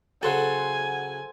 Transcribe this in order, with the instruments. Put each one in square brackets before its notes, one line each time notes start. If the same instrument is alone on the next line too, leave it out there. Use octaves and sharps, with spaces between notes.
[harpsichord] C#3 F#3 [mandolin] A4 C5 F#5 [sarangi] G#5